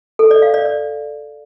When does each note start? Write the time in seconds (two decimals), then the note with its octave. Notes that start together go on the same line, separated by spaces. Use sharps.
0.19 A4
0.31 D5
0.42 F5
0.54 D5
0.65 D5